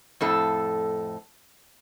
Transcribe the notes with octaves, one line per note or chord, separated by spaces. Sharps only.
F2 A2 A4